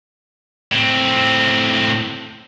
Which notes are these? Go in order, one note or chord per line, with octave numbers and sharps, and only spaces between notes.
A2 C4